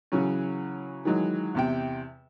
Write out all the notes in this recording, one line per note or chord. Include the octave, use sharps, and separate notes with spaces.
C#3 E3 F#3 C#4
D#3 E3 F#3 G#3
E2 C3 G5